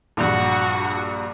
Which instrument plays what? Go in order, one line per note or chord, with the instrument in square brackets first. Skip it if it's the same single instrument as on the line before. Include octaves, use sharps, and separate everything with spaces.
[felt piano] A#1 G2 [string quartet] F#4 F#5